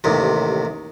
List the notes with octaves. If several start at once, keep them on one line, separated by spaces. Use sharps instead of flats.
A1 D#2 C3